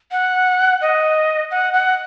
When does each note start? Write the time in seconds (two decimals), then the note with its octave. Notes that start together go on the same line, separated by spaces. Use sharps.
0.12 F#5
0.81 D#5
1.51 F#5
1.73 F#5